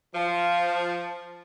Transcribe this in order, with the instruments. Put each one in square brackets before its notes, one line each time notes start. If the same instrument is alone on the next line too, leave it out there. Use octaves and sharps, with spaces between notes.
[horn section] F3